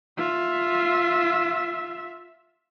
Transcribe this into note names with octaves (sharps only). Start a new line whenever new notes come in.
F4 E5